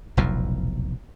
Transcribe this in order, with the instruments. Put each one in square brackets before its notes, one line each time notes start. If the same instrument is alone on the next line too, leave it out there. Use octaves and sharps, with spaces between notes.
[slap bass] F1 B1 E2 A#2